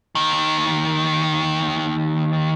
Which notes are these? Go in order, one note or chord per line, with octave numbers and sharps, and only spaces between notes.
D#2 D#3